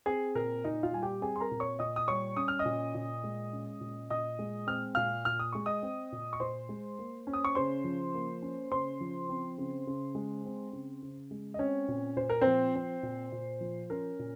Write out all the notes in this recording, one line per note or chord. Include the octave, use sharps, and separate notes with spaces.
C4 G#4
A#2 A#4
A#2 D#4 D#5
F4 F5
G3 G#5
G4 G5
C4 G#4 G#5
C6
A#4 A#5
A#2
C#5 C#6
A#2 D#5 D#6
D#6
G3 C#5 C#6
C#4 D#6
F6
D#5 D#6
A#2
A#2
G#3
C#4
A#2
A#2 D#5 D#6
G#3
C4 F6
A#2 F5 F6
A#2 F6
D#6
G#3 C#6
D#5 D#6
C4
A#2
C#6
A#2 C5 C6
G#3
A#3
C#4
D#6
C#6
C#3 C5 C6
F3
A#3
C#4
C#3 C5 C6
F3
C4
C#3
C#3
G#3
C4
C#3
C#3
G#3
D#5
C4 C#4 C#5
A#2
A#2 C5
A#4
F3 C4 C5
C4
A#2
A#2
F3
C#4 A#4
A#2